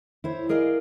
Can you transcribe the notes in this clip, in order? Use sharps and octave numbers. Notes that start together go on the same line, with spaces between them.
E4 C5 C#5
G#4 A#4 D5 D#5 F5